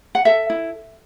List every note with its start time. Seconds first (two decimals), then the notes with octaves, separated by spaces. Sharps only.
0.15 F#5
0.25 A4 E5
0.50 E4